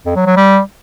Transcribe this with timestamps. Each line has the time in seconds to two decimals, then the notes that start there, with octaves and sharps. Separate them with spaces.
0.06 F2
0.16 F#3
0.26 F#3
0.36 G3